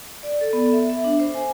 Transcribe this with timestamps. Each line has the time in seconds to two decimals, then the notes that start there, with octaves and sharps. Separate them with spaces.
0.23 D5
0.41 A4
0.53 B3
0.72 E5
0.89 E5
1.04 D4
1.20 C5
1.34 G#5